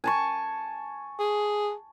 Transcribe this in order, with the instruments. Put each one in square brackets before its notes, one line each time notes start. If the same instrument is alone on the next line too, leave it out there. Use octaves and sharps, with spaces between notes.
[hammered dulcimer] G#5 A5 C#6
[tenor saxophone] G#4